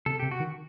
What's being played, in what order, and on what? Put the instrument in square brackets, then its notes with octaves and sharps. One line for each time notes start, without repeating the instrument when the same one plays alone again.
[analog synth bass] C3 [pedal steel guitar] A4
[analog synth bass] C3 [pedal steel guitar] G4
[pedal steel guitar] F#4
[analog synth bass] D#3